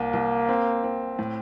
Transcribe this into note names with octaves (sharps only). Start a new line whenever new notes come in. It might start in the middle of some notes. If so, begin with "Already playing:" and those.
Already playing: C2 A#3
C2
C4
C4
A2